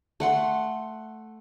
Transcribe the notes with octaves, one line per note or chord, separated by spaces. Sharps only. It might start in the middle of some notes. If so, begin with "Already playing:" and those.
A3 F#5 C6